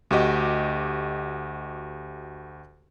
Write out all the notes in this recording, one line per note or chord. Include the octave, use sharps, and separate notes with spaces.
D2 F#4 G4 D#5